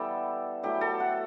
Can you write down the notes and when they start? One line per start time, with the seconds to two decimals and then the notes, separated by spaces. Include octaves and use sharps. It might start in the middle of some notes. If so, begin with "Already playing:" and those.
Already playing: E3 G3 B3 G4 A4
0.63 F#3 A3 E4 G4
0.81 A4
1.00 F#5